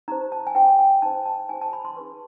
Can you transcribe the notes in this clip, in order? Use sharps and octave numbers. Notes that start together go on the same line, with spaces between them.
D#4 G4 C5 A#5
A5
G#5
D#4 G4 C5 G5
G#5
D#4 G4 C5 A5
A5
D#4 G4 C5 G#5
A5
B5
C6
D#4 G#4 B4 C#6